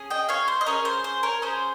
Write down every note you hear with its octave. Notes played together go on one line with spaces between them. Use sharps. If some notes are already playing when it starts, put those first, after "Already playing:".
Already playing: C#4 G#4
D#5 G5
C#5 F5
C5
D#5
C#4 G#4 A#4 C#5
C5
C5
A#4 C#5
C#4 G#4 C5